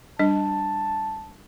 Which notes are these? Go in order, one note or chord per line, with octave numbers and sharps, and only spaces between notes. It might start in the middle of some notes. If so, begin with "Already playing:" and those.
G3 D4 D#5 A5